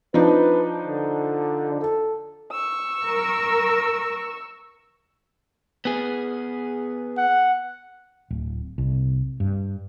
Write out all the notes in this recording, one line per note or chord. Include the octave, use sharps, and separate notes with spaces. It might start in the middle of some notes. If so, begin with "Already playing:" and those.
F3 D4 D#4 B4
D3
A4
C#6 E6
A#4
B3 G#4
F#5
D1
C2
G2